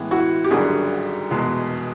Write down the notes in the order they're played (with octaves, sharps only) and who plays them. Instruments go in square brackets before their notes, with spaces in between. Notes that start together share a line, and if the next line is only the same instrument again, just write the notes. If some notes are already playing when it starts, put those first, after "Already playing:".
Already playing: [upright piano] A2 E3 G#3 B3
[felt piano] E4 F#4
G4
[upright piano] G#1 F#2 D3 G3 [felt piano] F#4 G#4
[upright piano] F1 E2 B2 G#3